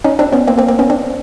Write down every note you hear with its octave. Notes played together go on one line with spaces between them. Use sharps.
C#4 D#4
C4 D4
B3 C#4
A#3 C4
A#3 C4
A#3 C4
B3 C#4
C4 D4